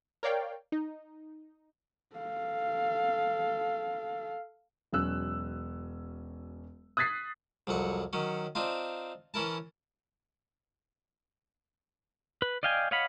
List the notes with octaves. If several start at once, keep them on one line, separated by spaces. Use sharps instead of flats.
A#4 C#5 D5 F5 G5
D#4
A4 F5
E1 F#3 C#4 E6 F#6
D#6 F#6 G#6 A6 B6 C7
C2 F2 F#3 F#5
D#3 F#3 C#4
C4 D4 D#4 F4
E3 C#4 E4 A#4 A5
B4
D5 D#5 F5 G5 G#5
C#5 D#5 F5 F#5 B5